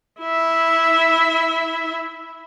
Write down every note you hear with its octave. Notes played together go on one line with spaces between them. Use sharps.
E4 E5